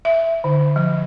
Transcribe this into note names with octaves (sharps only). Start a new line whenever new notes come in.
E5
D3
F3